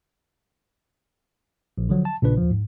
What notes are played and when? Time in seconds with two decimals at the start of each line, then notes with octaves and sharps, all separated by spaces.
1.78 A#1
1.89 D3 F3 F#3
2.05 A5
2.21 A#1 A#2 C#3 D4 B4
2.37 D#2 F3
2.51 G#2